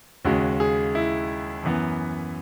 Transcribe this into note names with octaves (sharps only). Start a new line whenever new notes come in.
D#2 C#3 G#3 F#4
G#4
E4
F#2 E3 B3